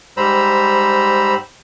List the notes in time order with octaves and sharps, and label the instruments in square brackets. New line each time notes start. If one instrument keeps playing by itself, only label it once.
[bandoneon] G#2 G3 C5 A#5 B5 E6